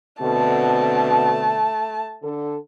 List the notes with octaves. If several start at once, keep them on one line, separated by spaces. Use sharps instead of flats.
B2 D3 A3 C4 A5
D3 A4